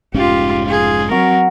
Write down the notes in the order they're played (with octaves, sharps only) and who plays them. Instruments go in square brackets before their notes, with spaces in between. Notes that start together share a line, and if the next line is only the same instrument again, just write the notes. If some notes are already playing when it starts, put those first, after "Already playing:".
[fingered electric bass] F1 G#2 C#4 [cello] F4 G4
[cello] F4 G#4
[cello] F#3 A#4 [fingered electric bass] C4 [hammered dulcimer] F#4